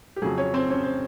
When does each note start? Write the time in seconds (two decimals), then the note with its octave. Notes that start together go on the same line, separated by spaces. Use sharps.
0.16 G4
0.22 F2 C#3 F#3 G#4
0.38 C#4 C#5
0.54 C4 C5
0.70 C#4 C#5
0.83 C5